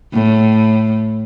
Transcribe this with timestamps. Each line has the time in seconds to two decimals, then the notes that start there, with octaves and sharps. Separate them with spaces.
0.13 A2